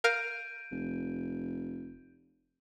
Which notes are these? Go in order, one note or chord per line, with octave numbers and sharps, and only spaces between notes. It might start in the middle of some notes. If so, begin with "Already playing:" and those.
A#4 F5 F6 G6 D7 D#7
F1